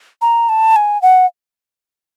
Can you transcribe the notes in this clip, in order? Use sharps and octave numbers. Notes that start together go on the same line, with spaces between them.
A#5
A5
G#5
F#5